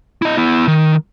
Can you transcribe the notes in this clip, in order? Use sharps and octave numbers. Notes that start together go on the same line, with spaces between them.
E4 D#5
B3 E4
D#3